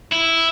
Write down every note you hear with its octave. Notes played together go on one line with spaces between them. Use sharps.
E4